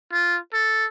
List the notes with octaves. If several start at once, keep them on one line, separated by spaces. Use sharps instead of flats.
F4
A4